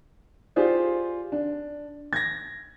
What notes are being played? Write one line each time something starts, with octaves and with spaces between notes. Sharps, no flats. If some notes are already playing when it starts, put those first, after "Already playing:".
F4 G4 G#4 C5 D5
D4
G#6 A#6